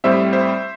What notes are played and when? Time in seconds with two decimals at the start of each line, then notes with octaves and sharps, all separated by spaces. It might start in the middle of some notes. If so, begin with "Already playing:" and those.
0.04 A2 G3 C4 C5 E5
0.33 C5 E5